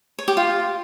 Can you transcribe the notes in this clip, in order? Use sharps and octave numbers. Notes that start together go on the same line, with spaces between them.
C#5
G4
F4